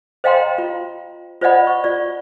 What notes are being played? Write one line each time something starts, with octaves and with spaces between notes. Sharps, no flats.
C5 D#5 F5 G5 A#5 C6
F4
F4 C5 D5 D#5 F#5 B5
C#6
F4 D5